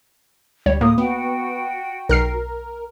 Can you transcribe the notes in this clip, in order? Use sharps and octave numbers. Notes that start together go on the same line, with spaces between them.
D2 G3 C#5
A2 A#3 D#6
B3 F#4 G5
B1 A#4 F6 C7